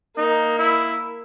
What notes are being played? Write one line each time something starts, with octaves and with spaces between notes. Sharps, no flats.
A#3 D#4
E4